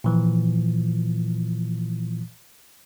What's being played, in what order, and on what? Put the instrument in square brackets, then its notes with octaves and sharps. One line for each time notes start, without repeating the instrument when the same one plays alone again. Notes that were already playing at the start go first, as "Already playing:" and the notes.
[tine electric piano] A#2 E3 F3